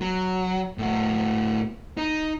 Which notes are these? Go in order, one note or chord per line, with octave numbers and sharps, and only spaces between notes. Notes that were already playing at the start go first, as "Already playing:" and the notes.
F#3
A2 F#4
D#4